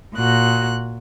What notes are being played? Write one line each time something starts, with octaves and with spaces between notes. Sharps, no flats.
A#2 F#4 F#6